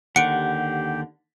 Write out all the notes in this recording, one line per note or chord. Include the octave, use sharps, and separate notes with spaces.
D#2 D3 G4 F#5 C#7 D7